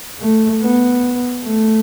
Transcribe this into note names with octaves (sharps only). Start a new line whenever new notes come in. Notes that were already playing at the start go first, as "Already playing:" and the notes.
A3
B3
A3